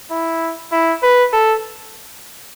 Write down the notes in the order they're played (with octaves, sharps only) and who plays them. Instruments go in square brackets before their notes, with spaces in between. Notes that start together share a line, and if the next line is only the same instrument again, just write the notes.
[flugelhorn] E4
E4
B4
A4